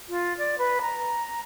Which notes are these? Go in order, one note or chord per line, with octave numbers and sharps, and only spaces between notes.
F4
D5
B4
A#5